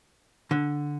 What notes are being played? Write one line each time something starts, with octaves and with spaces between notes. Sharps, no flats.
D3